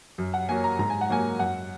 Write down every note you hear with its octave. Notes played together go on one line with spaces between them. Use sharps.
F#2
F#5
F#3 A#3 G#5
A#5
G#2 A#5
G#5
F#5
F#3 A#3 G#5
F#2 F#5